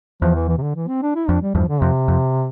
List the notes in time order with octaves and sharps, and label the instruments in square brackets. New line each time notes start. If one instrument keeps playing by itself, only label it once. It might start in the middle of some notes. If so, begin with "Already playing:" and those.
[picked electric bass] E2 [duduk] F3
[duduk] E3
E3
C3
D3
E3
C4
D4
E4
[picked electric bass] F2 [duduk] D4
[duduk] G3
[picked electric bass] E2 G2 [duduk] F3
[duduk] D3
[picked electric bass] F2 [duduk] C3
[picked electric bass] F2